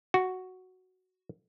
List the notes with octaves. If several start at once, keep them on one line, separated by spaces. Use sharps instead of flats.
F#4